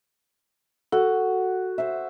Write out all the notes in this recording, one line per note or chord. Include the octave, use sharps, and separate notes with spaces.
F#4 A4
C5 E5